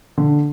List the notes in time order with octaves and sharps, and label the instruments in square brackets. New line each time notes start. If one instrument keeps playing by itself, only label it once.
[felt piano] D3